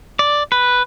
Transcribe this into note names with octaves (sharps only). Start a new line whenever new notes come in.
D5
B4